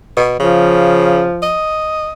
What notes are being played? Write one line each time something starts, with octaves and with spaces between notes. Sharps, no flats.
B2
C#3 F3
D#5